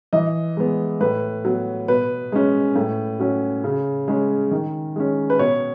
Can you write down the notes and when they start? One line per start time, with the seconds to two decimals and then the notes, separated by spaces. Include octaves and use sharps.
0.13 E3 D#5
0.57 G#3 B3
1.00 A2 B4
1.45 F#3 B3
1.88 B2 B4
2.32 G#3 C#4
2.76 A2
3.20 F#3 C#4
3.64 C#3
4.08 G#3 C#4
4.51 D#3
4.96 G#3 C#4
5.30 B4
5.39 B2 C#5